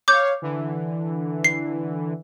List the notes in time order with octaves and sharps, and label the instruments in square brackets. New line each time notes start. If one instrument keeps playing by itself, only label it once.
[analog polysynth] C#5 F5 [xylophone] D6 G6
[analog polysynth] D3 E3
[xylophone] C7